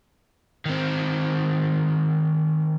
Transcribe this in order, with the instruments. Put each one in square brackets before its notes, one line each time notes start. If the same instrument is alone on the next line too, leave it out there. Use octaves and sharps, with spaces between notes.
[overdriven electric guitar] D#3 C4